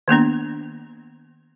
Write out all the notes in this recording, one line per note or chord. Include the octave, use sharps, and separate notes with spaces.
D#3 A#3 B3 D4